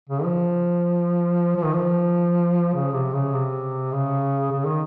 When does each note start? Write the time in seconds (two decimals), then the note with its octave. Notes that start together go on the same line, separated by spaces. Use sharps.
0.09 C#3
0.24 F3
1.56 F3
1.64 D#3
1.73 F3
2.74 C#3
2.94 C3
3.13 C#3
3.33 C3
3.92 C#3
4.51 C#3
4.66 D#3